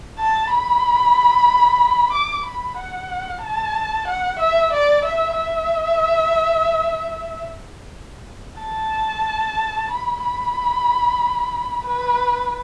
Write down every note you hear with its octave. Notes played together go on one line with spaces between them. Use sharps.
A5
B5
D6
B5
F#5
A5
F#5
E5
D5
E5
E5
A5
B5
B5
B4